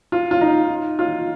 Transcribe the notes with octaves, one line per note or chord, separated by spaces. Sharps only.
F4
F4
D#4
F4